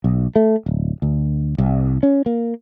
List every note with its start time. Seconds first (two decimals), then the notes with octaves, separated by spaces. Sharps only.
0.04 B1
0.36 A3
0.66 D1
1.02 D2
1.58 C2
2.03 C#4
2.26 A#3